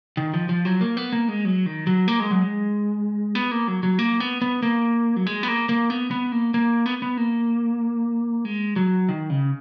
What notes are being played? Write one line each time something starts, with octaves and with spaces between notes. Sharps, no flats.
D#3
F3
F3
F#3
A#3
B3
A#3
G#3
F#3
D#3
F#3
A#3
G#3
F#3
G#3
B3
A#3
F#3
F#3
A#3
B3
B3
A#3
F#3
G#3
B3
A#3
A#3
B3
B3
A#3
A#3
B3
B3
A#3
G#3
F#3
D#3
C#3